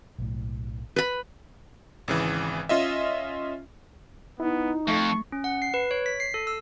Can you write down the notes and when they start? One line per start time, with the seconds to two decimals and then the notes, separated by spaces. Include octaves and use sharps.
0.19 B1 A2
0.96 B4 B5
2.08 G#1 C#3 E3
2.69 C#4 F4 D#5 E5
4.40 B3 D#4 E4
4.87 F2 A3 C#6
5.32 C#4
5.44 F#5
5.62 C7
5.74 B4
5.91 C#5
6.06 B6
6.20 C7
6.34 A4
6.47 E6